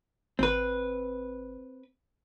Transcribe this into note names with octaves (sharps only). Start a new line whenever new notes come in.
G#1 C4 B4